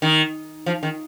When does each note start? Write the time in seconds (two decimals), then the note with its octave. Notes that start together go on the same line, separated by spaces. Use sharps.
0.02 D#3
0.66 F3
0.83 D#3